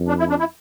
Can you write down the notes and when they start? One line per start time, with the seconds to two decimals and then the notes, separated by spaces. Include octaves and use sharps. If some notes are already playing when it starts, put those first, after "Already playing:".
Already playing: F2
0.08 D4
0.19 E4
0.30 D4
0.39 E4